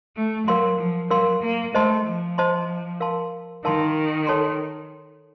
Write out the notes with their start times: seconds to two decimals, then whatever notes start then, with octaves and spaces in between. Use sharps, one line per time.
0.16 A3
0.47 F#3 A#4 F5 C6
0.79 F3
1.10 F#3 A#4 F5 C6
1.43 A#3
1.74 A3 C5 D#5 A5 C6
2.06 F3
2.38 C5 D#5 A5 C6
3.00 A#4 F5 A5 C6
3.65 D#3 A#4 F5 A5 C6
4.27 A4 C#5 A5 C6